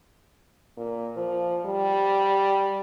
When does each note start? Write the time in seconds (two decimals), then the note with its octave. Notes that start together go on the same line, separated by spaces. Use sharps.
0.77 A#2
1.17 F3
1.66 G3